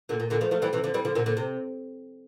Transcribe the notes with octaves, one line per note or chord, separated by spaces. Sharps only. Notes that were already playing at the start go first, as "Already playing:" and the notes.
A#2 D3
A#2
A#2 D3
F3 A3
F3 A3
E3 G3
C3 E3
D3 F3
E3 G3
D3 F3
A#2 D3
A#2 D3
C3